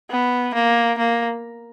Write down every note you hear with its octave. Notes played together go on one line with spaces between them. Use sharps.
B3
A#3
A#3